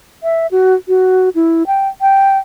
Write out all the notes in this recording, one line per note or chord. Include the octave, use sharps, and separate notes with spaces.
E5
F#4
F#4
E4
G5
G5